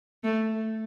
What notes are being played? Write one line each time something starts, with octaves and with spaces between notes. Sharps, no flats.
A3